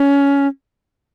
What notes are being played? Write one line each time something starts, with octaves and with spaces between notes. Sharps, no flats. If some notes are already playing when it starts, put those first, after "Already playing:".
Already playing: C#4